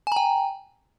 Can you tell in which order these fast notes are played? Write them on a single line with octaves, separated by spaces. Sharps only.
G#5 A#5 G5